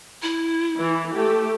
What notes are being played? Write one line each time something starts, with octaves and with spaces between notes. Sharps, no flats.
E4
E3
A3 G4